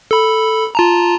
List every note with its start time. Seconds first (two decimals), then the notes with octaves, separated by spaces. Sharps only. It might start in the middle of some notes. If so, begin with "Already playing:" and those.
0.11 A4 B5
0.75 F4 A5 A#5